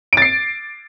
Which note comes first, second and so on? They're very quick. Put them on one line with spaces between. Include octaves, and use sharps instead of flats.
D7 A6 C7